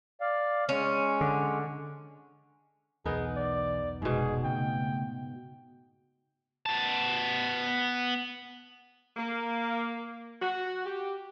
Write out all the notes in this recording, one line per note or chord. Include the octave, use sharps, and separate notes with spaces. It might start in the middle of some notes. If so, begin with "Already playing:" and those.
D5 F5
G#3 C#4
D3
B1 E2 B3 D#4 G#4 A#4
D5
F1 G#2 B2 G#4
C#3 A3 C4 G5
B3 A5
A#3
F#4
G4